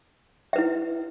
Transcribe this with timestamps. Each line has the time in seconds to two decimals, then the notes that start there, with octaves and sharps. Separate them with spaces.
0.53 E5
0.56 B4
0.58 E4